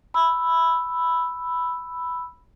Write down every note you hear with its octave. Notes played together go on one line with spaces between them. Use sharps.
B5 E6